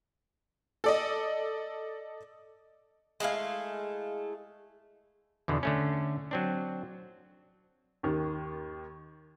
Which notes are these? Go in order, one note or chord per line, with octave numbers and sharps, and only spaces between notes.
A4 D5 D#5
G#3 A3 E4 F5
E2 B2 D3
D3 A3 C#4
F#3 C4 D4
D#2 D#3